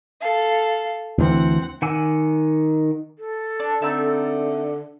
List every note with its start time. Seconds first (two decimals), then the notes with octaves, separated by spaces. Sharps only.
0.20 A4 F5
1.18 D2 E3 C4 F#5
1.82 D#3 F#5 G#5 D6 E6
3.19 A4
3.60 D4
3.82 D3 C4 D#4 E5